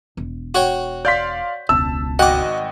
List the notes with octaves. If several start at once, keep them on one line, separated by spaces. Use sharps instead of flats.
E1
F#4 C#5 G5
D5 F5 C6 G6 B6
E1 C#2 A5 E6
G#1 F#4 D#5 F#5 G5 D6